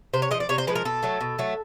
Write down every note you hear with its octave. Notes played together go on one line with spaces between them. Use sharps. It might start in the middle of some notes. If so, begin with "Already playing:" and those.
C3 C5
C#5
G#3 D#5
F3
D5
C3 C#5
C5
F3 G#3 B4
A#4
B2 A4
F#3 A3
B2
F#3 A3